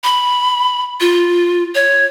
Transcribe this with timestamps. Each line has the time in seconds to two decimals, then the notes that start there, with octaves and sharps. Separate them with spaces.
0.04 B5
1.00 F4
1.75 C#5